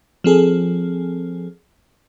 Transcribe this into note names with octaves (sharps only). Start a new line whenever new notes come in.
F3 C4 G#4 A4